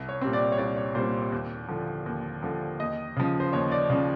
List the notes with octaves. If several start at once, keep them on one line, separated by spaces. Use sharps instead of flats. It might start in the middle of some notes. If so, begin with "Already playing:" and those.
Already playing: C2
C#5
A#2 G3 C4
D5
C#5
C2 D5
C#5
A#2 G3 C4 C5
D#2
D3 F3
D#2
D3 F3
D#2 D#5
C#3 F3
C5
D#2 C#5
D5
C#3 F3